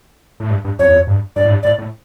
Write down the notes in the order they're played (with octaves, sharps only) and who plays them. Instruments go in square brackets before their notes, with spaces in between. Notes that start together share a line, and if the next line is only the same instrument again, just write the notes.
[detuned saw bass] A2
G2
G2
[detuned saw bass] F2 [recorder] C#5
[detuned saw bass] E2
F2
G2
[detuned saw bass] G2 [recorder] D5
[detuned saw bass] A2
G2
[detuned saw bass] A2 [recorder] D5
[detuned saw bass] A2